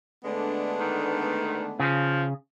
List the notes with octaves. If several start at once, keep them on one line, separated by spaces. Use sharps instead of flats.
D3 G#3 A3 B3 D4
D#3
C#3 F3